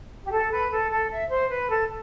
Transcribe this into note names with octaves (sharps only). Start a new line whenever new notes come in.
G4
A4
B4
A4
A4
E5
C5
B4
A4